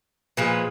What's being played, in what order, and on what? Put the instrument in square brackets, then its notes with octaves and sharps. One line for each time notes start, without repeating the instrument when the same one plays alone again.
[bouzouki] A#2 F3 G#3 B4